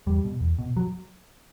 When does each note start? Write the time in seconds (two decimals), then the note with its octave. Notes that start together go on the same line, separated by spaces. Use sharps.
0.06 E2 G3
0.24 B2
0.41 E2
0.59 B2
0.77 F#3